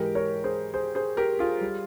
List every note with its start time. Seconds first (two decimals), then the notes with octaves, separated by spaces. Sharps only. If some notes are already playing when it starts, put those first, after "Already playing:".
Already playing: G#2 E3 G#3 G4 A#4
0.15 A#4 C#5
0.44 G#4 C5
0.74 G#4 C5
0.95 G#4 C5
1.17 G4 A#4
1.39 F4 G#4
1.61 G3